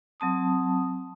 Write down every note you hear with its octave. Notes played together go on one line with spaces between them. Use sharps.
F#3 C4 A5 D#6